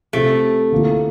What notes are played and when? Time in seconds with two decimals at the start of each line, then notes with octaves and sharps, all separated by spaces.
0.13 C3 F3 A3 C4 G4
0.72 D3 F3 A#3 E4